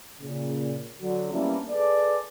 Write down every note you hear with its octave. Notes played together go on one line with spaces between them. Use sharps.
A#2 C#3
D3 F#3
G3 A#3 B3 C#4 D4 E4
G#4 A4 B4 D5